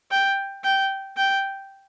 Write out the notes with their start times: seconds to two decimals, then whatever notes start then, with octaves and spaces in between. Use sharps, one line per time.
0.11 G5
0.64 G5
1.17 G5